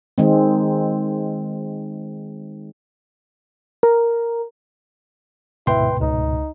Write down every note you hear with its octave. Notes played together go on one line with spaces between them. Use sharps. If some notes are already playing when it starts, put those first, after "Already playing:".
D#3 G#3 C4
A#4
D2 G#2 B2 E4 B4 G5 C6
C#2 D#4